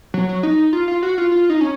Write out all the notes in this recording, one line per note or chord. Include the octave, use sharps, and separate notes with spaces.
F#3
F#3
D#4
F4
F4
F#4
F4
F4
D#4
C#4